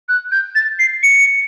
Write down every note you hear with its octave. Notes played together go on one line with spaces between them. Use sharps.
F#6
G6
A6
C7
C#7